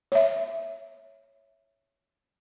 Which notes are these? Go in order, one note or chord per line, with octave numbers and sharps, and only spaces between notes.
C#5 E5